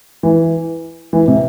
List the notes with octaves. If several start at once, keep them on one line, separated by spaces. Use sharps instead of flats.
E3
E3
C3